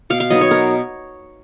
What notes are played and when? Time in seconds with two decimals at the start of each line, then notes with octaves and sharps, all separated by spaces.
0.10 B2 F5
0.20 F5
0.30 F#3 B3 D#4 D#5
0.41 C#5
0.51 B2 A#4